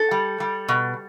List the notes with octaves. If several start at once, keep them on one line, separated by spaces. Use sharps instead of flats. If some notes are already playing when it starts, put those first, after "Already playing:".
Already playing: A4
G3
G3
B2